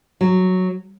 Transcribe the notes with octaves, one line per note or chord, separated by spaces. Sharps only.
F#3